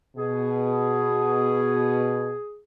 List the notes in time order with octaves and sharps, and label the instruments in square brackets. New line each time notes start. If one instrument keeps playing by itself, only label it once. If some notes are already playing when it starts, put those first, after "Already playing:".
[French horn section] B2 [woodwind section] G#4